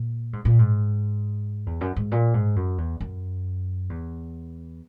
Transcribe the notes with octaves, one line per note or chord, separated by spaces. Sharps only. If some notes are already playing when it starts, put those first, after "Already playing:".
Already playing: A#2
G#2
A#2
G#2
E2
F#2
G#2
A#2
G#2
F#2
E2
F#2
E2